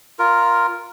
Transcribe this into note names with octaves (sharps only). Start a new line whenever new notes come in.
F4 A#4